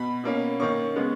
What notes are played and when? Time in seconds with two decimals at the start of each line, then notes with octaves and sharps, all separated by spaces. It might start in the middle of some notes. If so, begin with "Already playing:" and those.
Already playing: B2 B5
0.24 B2 A#3 C#4
0.60 D#3 A#3 C#4 C#6
0.96 C#3 G#3 B3